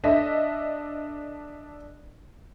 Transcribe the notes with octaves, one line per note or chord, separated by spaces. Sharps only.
D4 A4 D#5 E5